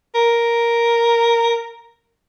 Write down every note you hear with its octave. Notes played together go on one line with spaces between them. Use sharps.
A#4